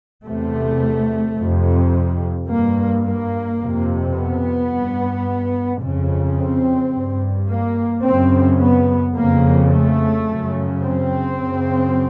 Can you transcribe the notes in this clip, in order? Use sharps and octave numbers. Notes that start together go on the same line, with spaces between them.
E2 C3 A3
F2 C3
G2 A#3
A#3
F2 C3
B3
G2
F2 C#3
C4
G2
A#3
F#2 C#3 C4
B3
F2 C#3 A#3
A3
F#2 C#3
C4
F#2 C#3